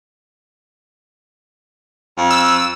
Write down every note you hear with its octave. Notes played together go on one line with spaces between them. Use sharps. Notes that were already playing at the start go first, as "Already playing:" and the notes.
F2
E6